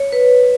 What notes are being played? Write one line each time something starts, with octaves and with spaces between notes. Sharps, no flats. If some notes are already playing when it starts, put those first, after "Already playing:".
Already playing: C#5
B4